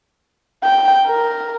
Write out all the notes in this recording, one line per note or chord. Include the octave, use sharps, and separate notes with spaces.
G5
A#4